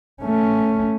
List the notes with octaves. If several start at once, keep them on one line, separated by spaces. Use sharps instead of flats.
A3 C#4